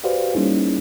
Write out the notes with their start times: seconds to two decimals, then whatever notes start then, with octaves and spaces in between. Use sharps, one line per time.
0.04 F#4 G4 B4 C5 D5 F5
0.34 G3 A#3 C#4 D#4 E4 G#4